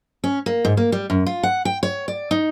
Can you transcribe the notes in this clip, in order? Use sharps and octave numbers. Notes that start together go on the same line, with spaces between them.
C#4
A#3
G#2
A#3
G3
F#2
F4
F#5
G5
C#5
D5
D#4